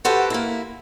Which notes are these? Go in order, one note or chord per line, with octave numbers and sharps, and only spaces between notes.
F#4 G4 A4 B4 C5 G5
A#3 E4